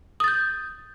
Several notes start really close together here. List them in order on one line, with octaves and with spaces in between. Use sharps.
D#6 A6 G6